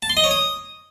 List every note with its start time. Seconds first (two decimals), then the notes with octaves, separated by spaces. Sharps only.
0.02 A5
0.10 C6
0.17 D#5
0.24 C#5
0.31 D#6